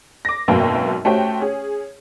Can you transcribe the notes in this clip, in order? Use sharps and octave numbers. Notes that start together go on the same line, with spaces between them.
D6 A#6
G#1 F#2 B2 A#3 G5
A3 C#4 F#4 G4 C5 G5
C#4 G#4